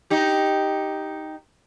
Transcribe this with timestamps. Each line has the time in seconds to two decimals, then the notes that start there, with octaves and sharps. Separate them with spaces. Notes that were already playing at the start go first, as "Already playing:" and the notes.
0.10 D#4 G4